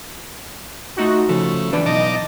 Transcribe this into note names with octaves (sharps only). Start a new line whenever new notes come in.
A3 D#4 F4 F#4
C#3 F3 A3
E3 D4 B4 D5
B1 D#4 D#5 A5 D6